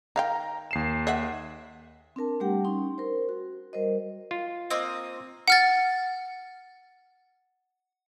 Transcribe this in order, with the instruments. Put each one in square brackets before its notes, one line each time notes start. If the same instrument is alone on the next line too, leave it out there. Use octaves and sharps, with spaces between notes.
[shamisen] D#3 F5 G5 [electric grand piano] A#5
[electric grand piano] D#2 C7 E7
[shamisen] D#5 E5 F#5
[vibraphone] C4 D4 A#4 A5
G3 A3 D4 G4 F#5 G5
C#4 D#4 C6
A#4 C5
F#4
G3 A#4 C5 D#5
[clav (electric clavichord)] F4
[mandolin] A#3 C4 D#5
[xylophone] F#5 F6 A6